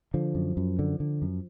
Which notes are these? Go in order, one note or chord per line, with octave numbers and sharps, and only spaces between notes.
D3 F3
F#2
F#2
D3
D3
F#2